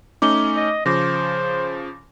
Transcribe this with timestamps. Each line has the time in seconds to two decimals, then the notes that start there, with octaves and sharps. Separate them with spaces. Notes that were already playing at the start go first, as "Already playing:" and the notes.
0.22 A3 C#4 D#4 D6 G7
0.56 D#5
0.86 C#3 F3 C5 D6 A#6